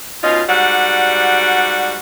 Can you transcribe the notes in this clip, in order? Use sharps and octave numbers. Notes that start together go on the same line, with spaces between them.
B2 C#4 D#4 F4
G#2 G3 F#4 D5 F#5